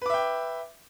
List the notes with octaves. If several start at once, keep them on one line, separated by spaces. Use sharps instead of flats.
B4 E5 G5 D6